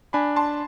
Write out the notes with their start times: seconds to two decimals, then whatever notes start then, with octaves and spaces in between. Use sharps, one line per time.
0.13 D4 G#5 B5
0.36 A5 C6